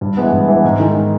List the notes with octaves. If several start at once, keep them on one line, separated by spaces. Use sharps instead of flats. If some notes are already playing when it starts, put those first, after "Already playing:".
G2
E3 G#3 B3
G2
E3 G#3 B3
G#2
D#3 G#3